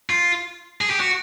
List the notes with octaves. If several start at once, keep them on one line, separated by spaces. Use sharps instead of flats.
F4
G#4
G4
F#4